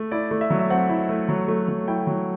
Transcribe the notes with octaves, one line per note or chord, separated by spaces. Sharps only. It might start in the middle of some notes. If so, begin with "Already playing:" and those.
Already playing: A3
E4 D5
A3
E5
F#3
E5
C4 F#5
E4
A3
F#3
A3
F#3
E4 G5
F#3